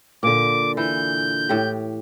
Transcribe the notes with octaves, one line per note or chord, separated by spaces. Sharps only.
A#2 D3 D6
E3 G6
A2 G4